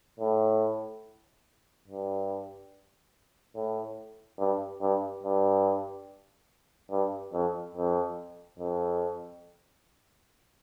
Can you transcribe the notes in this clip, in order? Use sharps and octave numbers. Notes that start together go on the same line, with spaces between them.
A2
G2
A2
G2
G2
G2
G2
F2
F2
F2